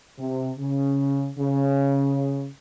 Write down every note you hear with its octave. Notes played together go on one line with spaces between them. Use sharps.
C3
C#3
C#3